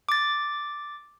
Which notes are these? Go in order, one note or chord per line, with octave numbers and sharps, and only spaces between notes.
D6 A6